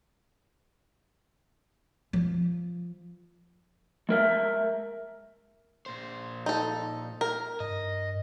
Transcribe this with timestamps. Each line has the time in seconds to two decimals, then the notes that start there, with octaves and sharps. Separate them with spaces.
2.13 F3
4.09 G#3 A#4 E5
5.86 A#2 C5
6.46 D#4 A4
7.21 A#4
7.60 G2 D#5